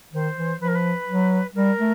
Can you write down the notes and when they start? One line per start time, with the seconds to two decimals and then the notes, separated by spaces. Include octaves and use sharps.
0.13 D#3 C5
0.37 E3
0.60 F3 B4
0.67 A#4
0.75 B4
1.08 F#3
1.54 G3 A#4
1.79 A3